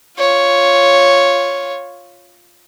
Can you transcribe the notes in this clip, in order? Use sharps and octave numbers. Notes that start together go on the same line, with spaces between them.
F4 C#5